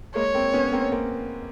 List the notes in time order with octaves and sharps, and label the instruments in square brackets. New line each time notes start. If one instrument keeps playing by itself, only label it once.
[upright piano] G#3 A#3 [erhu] C#5
[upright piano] A#3 C4
B3 C#4
A#3 C4
A#3 C4